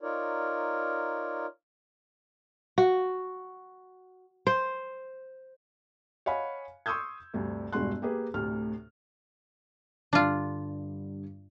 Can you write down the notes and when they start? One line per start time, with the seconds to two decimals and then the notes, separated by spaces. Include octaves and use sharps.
0.01 D#4 F4 A#4 C#5 D5
2.78 F#4
4.47 C5
6.26 C#5 D#5 F5 F#5 G#5 B5
6.86 C6 C#6 D#6 E6 G6 G#6
7.34 D2 G2 C3
7.72 E1 G2 G#3 F#4 C6 F#6
8.02 A#3 G4 G#4 B4
8.34 D2 A2 C3 F6
10.13 G2 D3 D4 F4